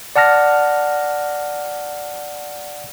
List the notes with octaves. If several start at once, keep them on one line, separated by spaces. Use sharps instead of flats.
D5 F#5 A5 F6 A#6